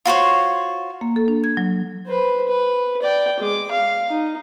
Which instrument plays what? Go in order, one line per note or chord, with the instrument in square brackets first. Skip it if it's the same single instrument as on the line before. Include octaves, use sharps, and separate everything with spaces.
[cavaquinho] F4 F#4 C5 C#5
[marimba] A#3
A4
D4
G#6
F#3
[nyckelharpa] B4 C5
B4
D5 G5
G#3 D6
F5
D#4